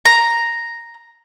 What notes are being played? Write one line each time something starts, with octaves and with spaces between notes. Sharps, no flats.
A#5